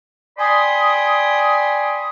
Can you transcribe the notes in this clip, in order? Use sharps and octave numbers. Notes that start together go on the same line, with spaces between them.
D5 G5 G#5 B5 C6 D#6